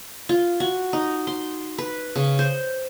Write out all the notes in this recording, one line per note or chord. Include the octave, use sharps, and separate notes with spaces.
F4
F#4
D#4
C6
B4
C#3
C5